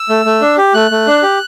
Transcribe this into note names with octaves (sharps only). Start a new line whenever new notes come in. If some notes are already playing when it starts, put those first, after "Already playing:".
Already playing: E6
A3
A3
D4
G4
A3 F#6
A3
D4
G4